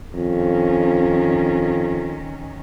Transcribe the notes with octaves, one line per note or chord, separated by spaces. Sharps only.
F2 D#3 C#4